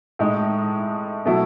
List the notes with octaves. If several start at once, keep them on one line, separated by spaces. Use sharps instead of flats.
A2 G#3 D#4
B2 F#3 A3 E4